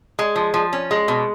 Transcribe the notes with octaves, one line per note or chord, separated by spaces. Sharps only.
G#3
F3
F3
C#4
G#3
B2